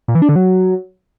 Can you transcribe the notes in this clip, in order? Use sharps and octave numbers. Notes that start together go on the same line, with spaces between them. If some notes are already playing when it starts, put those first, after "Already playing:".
A#2
E3
D4
D3
F#3